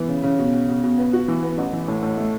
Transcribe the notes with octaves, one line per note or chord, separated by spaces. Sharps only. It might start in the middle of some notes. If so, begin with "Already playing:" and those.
Already playing: E3 B3
C#3
C#3
B2
B2
B2
B2
B3
F#4
E3
B3
A1
E3
A2
A2
A3